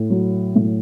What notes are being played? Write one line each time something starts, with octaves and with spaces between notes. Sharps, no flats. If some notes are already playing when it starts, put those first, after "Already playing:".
Already playing: A2
F#3
A2